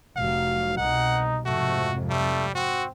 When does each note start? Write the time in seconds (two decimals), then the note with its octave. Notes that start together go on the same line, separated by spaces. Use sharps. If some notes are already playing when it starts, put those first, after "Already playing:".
0.16 F1 F#3 F5
0.77 C2 B2 D#4 F#5
1.46 F2 G#2 C3 A3 F#4
2.10 G3 A3
2.55 C4 F#4